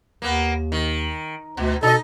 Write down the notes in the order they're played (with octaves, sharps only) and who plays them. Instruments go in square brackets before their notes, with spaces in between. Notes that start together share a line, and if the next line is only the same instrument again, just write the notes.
[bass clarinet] D#2 [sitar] A#3 B3
[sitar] D#3
[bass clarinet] D2 [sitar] B2
[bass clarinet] B2 [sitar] D#4 D#5 [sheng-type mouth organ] A4